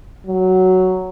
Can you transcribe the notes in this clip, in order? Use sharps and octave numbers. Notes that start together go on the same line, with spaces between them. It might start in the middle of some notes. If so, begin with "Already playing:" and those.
F#3